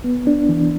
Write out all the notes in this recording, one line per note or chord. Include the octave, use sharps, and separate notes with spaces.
B3
D4
E3